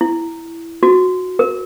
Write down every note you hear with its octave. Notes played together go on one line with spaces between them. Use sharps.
E4
F#4
A#4